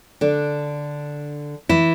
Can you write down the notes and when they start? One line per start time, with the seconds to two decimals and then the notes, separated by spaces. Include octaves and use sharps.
0.21 D3 D4
1.69 E3 E4